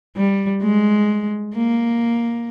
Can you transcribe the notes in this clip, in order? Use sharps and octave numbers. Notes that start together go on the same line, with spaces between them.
G3
G#3
A#3